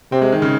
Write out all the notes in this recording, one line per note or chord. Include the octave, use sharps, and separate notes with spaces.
C3 C4
G#3
D#3
C#3